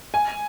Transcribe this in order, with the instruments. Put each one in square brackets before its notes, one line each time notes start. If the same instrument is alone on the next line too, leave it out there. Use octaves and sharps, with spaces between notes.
[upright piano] G#5